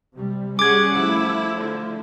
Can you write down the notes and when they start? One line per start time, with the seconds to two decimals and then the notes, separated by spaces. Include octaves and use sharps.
0.14 C3 G3
0.59 G3 C#4 G#4 F#5 D6 G#6
0.96 F3 A3 E4
1.60 D3